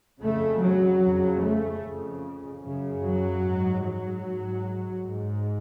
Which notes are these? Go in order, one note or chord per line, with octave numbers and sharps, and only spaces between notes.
F2 C#3 A3
F#3
F2 C#3
A3
F2 C#3
F#2 C#3
F#3
G#2
F#3
G#2
G#2